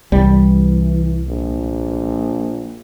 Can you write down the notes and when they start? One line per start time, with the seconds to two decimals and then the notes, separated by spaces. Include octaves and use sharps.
0.12 C2 E3 G3
1.28 A#1